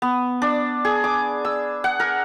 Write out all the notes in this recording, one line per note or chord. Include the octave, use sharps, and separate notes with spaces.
B3
D4
G#4
D6
E6
F#5
A#4